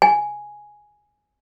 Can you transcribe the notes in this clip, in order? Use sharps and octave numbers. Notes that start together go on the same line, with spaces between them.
G#5